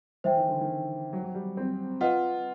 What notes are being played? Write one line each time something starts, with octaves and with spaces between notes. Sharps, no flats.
E3 C5 E5 G5
D#3
D3
D#3
F#3
F#3
G3
C4
F4 B4 D#5 F#5